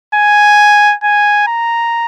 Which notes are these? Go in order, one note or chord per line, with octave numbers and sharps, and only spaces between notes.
G#5
G#5
A#5